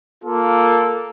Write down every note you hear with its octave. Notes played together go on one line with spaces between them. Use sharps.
A#3 F4 A4